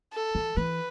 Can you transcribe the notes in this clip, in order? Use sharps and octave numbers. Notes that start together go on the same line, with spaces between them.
A4
E3
E3 B4